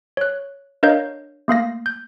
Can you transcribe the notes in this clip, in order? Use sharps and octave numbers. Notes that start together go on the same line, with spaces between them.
C#5 F#6
D4 A#4 C#5 D#5 F5 G6
A3 A#3 F5 A#6
G6